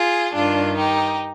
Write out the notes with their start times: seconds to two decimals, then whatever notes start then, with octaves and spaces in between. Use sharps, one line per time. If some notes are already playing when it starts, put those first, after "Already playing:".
Already playing: F4 G#4
0.34 G2 D#3 D4 F4
0.77 D#4 G4